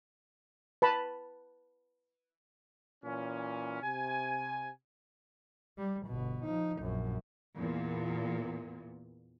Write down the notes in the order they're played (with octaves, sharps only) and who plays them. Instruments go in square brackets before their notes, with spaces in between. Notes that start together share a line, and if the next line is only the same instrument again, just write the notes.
[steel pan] B4 A5 B5
[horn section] A#2 E3 C#4
C3 G#5
[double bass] G3
G1 B2
F3 D#4
A#1 F#2
[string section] E2 A#2